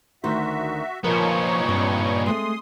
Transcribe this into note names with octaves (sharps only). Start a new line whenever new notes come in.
D2 D#3 F#4 C5 E5
A#2 F3 B3 D#4 A#4 C#5 C#6
G2 C4
G#3 A3 C4 C6 D#6